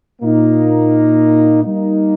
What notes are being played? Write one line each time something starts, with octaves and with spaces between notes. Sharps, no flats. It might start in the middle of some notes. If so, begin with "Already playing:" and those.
A#2 A#3 D#4
G3 A#3 D#4